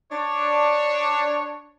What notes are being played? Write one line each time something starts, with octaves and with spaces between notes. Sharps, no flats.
D4 C#5